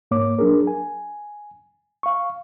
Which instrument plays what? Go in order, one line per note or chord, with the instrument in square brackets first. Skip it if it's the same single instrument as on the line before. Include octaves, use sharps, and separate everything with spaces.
[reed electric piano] G#2 A#3 C#5 D6
F#3 D4 G#4 A#4
G#5
F5 C#6